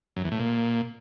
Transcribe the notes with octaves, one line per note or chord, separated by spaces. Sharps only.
F#2
E2
A2
A#2